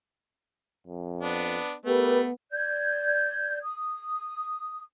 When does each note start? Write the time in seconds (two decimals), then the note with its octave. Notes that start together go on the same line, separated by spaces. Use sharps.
0.87 F2
1.21 B3 D4
1.86 A3 B3 G4 A#4 B4
2.52 D5 G6 G#6
3.63 D#6